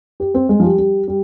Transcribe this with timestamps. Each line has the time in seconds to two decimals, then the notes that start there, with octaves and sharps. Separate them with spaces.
0.20 G4
0.34 C4
0.49 G#3
0.60 F3
0.64 G3
0.78 G3
1.08 G3